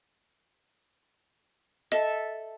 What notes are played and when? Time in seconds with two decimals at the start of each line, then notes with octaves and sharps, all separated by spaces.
1.92 A4 D#5 E5 A5